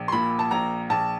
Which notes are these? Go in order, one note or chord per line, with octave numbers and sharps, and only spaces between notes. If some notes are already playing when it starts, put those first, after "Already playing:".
Already playing: A#1
C6
A#2 B5
A5
A#1 A#5
A#1 A5